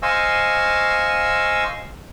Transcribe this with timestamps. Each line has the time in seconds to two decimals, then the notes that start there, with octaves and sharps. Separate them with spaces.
0.02 C5 D#5 F5 G#5 C#6 E6